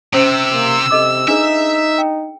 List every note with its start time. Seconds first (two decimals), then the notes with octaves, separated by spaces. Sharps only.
0.14 C3 C#4 C5 E6
0.53 A#3
0.91 C3 A4 D#5 D6
1.28 D4 D#4 G#4 B4 E5
1.98 G5